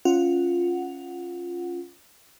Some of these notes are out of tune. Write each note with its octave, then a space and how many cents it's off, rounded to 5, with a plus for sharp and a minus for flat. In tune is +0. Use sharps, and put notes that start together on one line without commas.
C#4 +0 F4 +0 F#5 +0